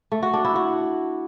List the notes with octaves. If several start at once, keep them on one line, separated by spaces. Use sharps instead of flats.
A3
F#4
D4
E4
F#4